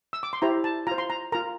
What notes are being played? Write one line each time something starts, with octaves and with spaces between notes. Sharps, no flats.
E6
D6
C6
E4 G4 C5 A#5
A5
F4 C5 A#5
C6
A#5
F4 A#4 A#5